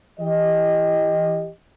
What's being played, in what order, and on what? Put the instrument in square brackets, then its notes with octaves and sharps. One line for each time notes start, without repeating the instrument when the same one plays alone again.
[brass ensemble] E3 G4 D#5